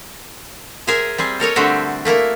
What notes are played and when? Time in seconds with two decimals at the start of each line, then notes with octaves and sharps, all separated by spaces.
0.87 G#4 A#4 C5 E5 G#5
1.18 G3 C4 G#4
1.40 A4 A#4 C#5 D#5
1.56 D3 G3 A3 C4 F#4 G4
2.05 A3 A#3 E4 A#4